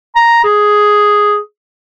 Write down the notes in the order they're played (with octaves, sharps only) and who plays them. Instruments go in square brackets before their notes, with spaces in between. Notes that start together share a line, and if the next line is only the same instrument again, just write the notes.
[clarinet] A#5
G#4